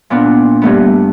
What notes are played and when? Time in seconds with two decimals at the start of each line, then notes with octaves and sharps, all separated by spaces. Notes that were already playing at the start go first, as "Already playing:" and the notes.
0.10 A#2 B3 D4
0.62 G2 A3 B3